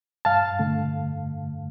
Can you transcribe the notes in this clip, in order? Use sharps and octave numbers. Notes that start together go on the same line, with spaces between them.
G2 F5 A5
D3 A3